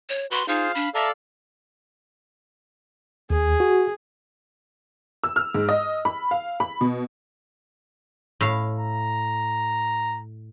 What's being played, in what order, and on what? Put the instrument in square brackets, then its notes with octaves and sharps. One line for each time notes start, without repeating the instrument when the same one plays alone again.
[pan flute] C#5
[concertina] F#4 B4 [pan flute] C6
[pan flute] D#4 [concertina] F4 G#4 C5 [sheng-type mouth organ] F5
[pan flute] D4 [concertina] B5
[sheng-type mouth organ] A4 D5 F5 [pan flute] E5 [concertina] A5 A#5
[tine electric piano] D#2 [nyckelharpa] G#4
[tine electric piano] F#4
[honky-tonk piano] E6
F6
G#2
D#5
B5
F5
B5
B2
[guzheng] A2 F5
[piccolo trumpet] A#5